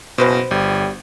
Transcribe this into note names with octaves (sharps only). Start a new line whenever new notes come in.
F#1 B2 F#4 B4 C5
G1 G3